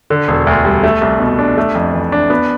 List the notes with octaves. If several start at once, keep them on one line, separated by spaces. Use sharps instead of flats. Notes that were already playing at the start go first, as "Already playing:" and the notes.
D3
E1
D2
G3
A3
C2
B2
D4
A3
F2
E3
D4
B3